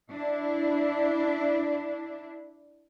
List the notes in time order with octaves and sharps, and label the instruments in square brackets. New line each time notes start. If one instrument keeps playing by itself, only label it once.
[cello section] D4 E4